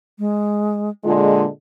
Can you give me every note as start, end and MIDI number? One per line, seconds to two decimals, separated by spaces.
0.19 0.90 56
1.04 1.46 46
1.04 1.46 50
1.04 1.46 56
1.04 1.46 65